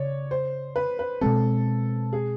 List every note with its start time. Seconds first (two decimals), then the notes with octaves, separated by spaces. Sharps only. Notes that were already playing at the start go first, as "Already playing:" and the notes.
Already playing: C#3 C#5 D5
0.31 C5
0.76 B4
0.99 B4
1.21 B2 G#3 C4 A4
2.13 G#4